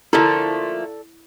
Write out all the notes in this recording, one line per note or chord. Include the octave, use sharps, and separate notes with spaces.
F3 A3 A#3 E4 A4 D5 A5